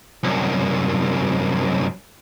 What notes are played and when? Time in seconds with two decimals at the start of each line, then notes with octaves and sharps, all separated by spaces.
0.23 C2 F#2